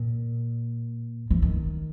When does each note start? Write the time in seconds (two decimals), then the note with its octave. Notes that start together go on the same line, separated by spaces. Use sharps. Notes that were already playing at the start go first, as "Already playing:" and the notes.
Already playing: A#2
1.31 E3
1.42 D#3